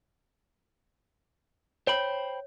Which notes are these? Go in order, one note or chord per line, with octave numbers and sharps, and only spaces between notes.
C5 C#5 G5 B5